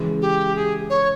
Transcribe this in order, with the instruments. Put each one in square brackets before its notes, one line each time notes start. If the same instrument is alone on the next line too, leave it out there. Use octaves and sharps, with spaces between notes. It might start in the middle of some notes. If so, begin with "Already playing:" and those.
Already playing: [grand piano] C#3 E3 G#3
[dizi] G4
G#4
C#5